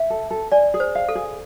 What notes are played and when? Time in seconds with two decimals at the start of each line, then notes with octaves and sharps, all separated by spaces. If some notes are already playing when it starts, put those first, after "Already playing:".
Already playing: E5
0.10 A4
0.31 A4
0.52 D5 G#5
0.74 G#4
0.80 C5
0.95 F5
1.09 A4
1.15 G#4